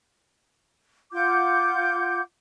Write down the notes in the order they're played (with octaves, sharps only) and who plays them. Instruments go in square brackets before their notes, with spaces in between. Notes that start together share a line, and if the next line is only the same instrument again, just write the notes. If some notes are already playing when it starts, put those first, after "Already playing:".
[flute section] F4 F#5 D6 G6